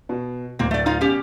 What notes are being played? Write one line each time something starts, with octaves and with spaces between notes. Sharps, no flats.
B2
D1 A#3 C4
A3 D5
D#4 F4 F5
B2 C#4 G4